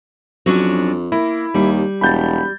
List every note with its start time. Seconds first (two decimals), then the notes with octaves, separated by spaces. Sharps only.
0.46 F2 F#3 C#4 D4
1.12 A#3 E4
1.54 D#2 G3
2.01 E1 B5 G6 A6